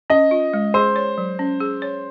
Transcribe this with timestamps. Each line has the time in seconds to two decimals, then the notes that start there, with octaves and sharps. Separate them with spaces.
0.10 C#4 D#5
0.31 F4
0.53 G#3
0.74 G#4 C5
0.96 C#5
1.18 F#3
1.39 C#4
1.60 G#4
1.82 C#5